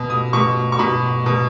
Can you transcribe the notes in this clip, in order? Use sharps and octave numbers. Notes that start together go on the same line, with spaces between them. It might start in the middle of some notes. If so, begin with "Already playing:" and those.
Already playing: B2
D#6
B2 C#6
C#6
B2 B5
B2